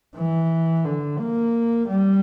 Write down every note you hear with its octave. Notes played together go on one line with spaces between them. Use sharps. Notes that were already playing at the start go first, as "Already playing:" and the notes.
E3
D3
A#3
G3